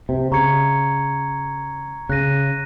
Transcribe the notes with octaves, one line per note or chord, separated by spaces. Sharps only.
C3
C#3 A#5 C#6 G#6 C#7
C#3 F#6 A#6 D#7